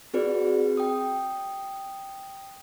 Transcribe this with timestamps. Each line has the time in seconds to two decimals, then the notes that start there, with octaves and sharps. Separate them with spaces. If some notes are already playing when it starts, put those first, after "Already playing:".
0.14 C4 F#4 G#4 B4 D5
0.77 G5 D#6